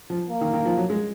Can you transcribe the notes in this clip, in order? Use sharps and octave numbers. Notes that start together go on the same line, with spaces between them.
F3
A#3
D#3
D#3
F3
F#3
G#3